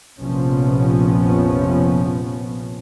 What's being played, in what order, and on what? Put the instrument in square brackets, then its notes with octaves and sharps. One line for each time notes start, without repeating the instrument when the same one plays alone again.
[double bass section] F1 A#1 C3 F3 B3 C#4